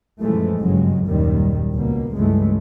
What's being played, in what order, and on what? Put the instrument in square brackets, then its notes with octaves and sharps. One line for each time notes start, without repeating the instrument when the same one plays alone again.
[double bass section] F#2 A#2 E3 F3 G#3 A3
F#1 G2 C#3 F#3 G#3
F#1 D#2 A#2 D#3 G3
C#2 B2 A#3
C#2 G2 E3 G#3 A3